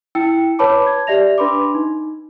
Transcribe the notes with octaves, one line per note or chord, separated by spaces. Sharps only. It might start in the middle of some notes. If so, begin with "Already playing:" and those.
E4 G5 E6 C#7
B4 C#5 A5 B5 D6
G#6
G4 D5 E5 A#6 F7
D4 B4 B5 C6 D6
D#4